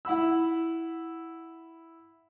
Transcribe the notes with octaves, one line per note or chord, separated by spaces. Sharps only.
E4 F#5 B5 E6